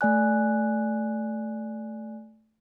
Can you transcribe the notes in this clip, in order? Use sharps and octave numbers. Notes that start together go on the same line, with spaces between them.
A3 D5 G#5 F#6